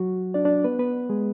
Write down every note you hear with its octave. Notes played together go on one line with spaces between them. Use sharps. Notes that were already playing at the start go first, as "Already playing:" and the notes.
Already playing: F#3 F#4
D4 D5
D4 D5
B3 B4
B3 B4
G#3 G#4